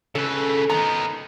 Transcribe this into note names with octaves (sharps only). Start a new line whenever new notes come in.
C#3 A4 B4
D#3 B3 A#5